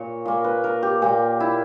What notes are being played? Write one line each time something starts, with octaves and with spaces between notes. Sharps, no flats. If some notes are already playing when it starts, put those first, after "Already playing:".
Already playing: A#2 A#3 C#5
A#2 A#3
B4
A#4
G4
A#2 A#3 G4
E4